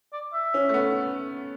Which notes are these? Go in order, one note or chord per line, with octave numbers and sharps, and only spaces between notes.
D5
E5
C#4
A3
B3